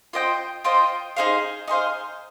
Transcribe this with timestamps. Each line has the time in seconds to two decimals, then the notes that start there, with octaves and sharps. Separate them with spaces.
0.13 F4 C5 D#5 G5
0.64 F4 C5 D#5 G5
1.16 D#4 G#4 C5 F5
1.68 D#4 G#4 C5 F5